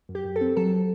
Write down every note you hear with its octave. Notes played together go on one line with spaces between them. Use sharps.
F#2
G4
F#2
A4
C4
F#3 A4